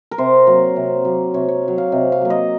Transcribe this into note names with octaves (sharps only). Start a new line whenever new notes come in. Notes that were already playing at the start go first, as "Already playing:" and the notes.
A#4
C3 C5
F#3 A#3
C3
F#3 A#3
C3 C#5
C#5
F#3 A#3
F5
C3 D#5
F5
F#3 A#3
D#5